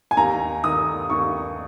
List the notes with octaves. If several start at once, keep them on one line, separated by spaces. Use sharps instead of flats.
G#5
D#2 A#5
D#3 D#6
D#2 C#6